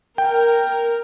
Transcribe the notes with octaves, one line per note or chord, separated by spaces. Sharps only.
A#4 G5